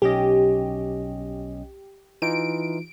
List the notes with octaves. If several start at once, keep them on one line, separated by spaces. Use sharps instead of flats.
B1 C#4 G4 D#5
E3 D#4 F4 D7